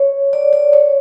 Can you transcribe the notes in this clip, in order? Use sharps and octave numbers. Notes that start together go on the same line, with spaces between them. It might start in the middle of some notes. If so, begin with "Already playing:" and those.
Already playing: C#5
D5
D5
C#5